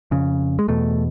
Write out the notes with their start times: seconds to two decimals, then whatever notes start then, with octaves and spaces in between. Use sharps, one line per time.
0.11 F2 C#3
0.59 G#3
0.68 E2 B2 A3